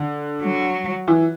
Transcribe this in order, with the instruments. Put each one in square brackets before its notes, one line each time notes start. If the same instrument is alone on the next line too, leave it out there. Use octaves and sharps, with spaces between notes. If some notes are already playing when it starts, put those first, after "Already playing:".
Already playing: [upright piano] D3
[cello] F#3
[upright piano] E3